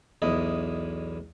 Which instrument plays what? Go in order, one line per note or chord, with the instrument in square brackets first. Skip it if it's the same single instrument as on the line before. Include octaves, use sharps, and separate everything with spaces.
[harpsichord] B1 E2 E4 D#5